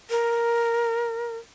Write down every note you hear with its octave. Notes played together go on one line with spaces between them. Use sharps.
A#4